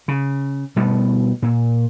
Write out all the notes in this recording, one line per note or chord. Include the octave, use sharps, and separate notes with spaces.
C#3
B2 G3 A3 B3
A#2